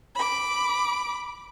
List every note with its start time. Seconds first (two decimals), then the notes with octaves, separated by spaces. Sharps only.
0.16 B5 D6